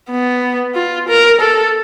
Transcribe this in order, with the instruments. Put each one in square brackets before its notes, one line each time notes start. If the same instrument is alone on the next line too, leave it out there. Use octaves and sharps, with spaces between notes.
[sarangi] B3
F4
A#4
A4